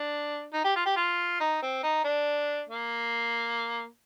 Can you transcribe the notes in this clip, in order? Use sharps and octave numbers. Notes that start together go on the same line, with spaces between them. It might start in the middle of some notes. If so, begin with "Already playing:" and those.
Already playing: D4
D#4
G4
F4
G4
F4
D#4
C4
D#4
D4
A#3